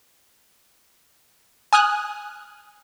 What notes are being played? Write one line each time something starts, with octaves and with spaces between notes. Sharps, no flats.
G#5 D#6 F6 F#6